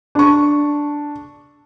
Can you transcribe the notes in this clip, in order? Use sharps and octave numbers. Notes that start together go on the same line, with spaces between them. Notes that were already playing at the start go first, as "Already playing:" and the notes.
D4 C#6